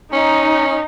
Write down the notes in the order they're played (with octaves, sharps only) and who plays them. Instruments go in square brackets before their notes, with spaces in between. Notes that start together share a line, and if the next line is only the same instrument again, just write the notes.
[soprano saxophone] C#4 [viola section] D#4